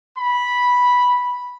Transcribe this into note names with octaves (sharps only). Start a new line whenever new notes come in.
B5